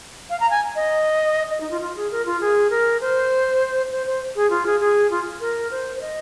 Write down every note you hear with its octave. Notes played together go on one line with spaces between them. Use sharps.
F5
A#5
G#5
D#5
D#5
D#4
F4
F4
G#4
A#4
F4
G#4
A#4
C5
C5
C5
G#4
F4
G#4
G#4
F4
A#4
C5
C5
D#5